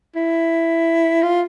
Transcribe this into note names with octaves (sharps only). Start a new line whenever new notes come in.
E4
F4